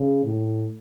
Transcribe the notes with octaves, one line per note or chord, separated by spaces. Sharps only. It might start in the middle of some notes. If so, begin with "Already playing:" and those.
Already playing: C#3
A2